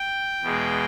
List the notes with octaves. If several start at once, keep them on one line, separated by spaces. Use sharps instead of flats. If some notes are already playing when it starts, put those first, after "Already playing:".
Already playing: G5
E2 B2 G#3